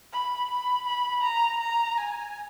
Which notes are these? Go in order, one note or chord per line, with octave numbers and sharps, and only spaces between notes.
B5
B5
B5
A#5
A#5
G#5